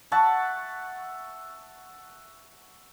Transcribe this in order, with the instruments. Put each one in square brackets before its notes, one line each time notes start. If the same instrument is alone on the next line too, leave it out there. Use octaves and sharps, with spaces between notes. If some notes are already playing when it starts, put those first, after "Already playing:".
[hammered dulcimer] E5 F#5 A5 C#6